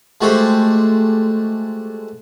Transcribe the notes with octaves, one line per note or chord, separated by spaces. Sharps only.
G#3 A3 F#4 G4 C5